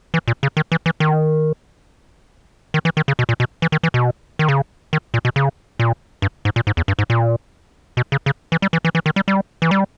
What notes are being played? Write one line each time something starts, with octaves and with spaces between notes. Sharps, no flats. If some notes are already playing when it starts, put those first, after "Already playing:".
E3
A#2
C#3
D#3
E3
E3
D#3
D#3
E3
D#3
C#3
B2
A#2
B2
E3
D#3
E3
B2
D#3
C#3
D#3
A#2
B2
C#3
A#2
G2
G#2
A#2
G#2
E2
G2
G#2
A#2
B2
C#3
C#3
E3
G3
E3
E3
E3
D#3
G3
G3
E3
G3